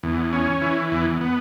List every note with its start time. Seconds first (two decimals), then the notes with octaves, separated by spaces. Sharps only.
0.03 E2
0.33 C#4
0.62 E3
0.92 E2
1.21 B3